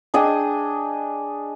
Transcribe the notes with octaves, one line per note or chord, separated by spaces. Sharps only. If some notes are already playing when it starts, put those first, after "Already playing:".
D4 G#4 D#5 G5